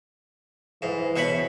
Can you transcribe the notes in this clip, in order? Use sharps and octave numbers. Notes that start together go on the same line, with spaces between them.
G#2 E3
B2 C#5 B5